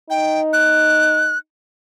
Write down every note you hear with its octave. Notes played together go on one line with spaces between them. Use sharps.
D#4 G5
F#6